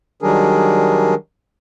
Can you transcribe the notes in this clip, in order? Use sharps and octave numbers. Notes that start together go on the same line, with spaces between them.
D#3 F#3 G3 D4 G#4 A#4